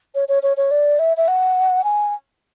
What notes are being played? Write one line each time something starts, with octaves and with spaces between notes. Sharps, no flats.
C#5
C#5
C#5
C#5
D5
E5
E5
F#5
G#5